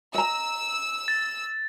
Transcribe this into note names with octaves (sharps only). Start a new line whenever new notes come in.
D#5 A#5 E6
A6